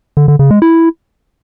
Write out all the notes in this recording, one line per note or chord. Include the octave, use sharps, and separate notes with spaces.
D3
D3
C#3
G#3
E4